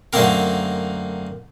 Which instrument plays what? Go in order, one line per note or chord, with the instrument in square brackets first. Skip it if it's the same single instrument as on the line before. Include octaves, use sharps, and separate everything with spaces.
[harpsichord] F#2 D3 A3 A#3 C4 A#4